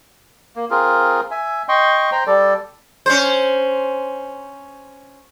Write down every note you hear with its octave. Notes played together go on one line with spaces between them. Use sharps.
A#3
C4 F4 G#4 A#4
E5 G#5
D#5 G5 C6 C#6
C5 G5 A#5
G3 A4 D5
C#4 C5